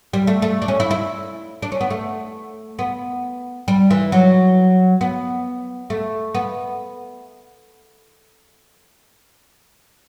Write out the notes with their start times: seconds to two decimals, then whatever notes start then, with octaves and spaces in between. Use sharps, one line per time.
0.13 G3
0.27 A3
0.42 A3
0.62 D4
0.68 C#4
0.80 E4
0.91 E4
1.62 D4
1.72 C#4
1.81 B3
1.90 A3
2.79 B3
3.68 G3
3.91 E3
4.12 F#3
5.01 B3
5.90 A3
6.35 B3